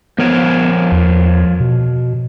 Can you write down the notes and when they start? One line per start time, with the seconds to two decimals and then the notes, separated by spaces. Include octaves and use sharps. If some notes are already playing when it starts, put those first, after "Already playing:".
0.18 F3 B3 A#4 C#5
0.92 E2
1.60 B2